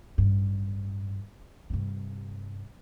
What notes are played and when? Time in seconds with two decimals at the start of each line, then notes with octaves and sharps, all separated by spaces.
0.18 A1 G2
1.70 G2 C3